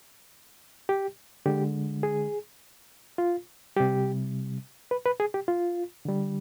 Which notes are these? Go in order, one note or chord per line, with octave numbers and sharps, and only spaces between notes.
G4
D3 G#3 G4
G#4
F4
C3 G3 G4
B4
B4
G#4
G4
F4
D3 G3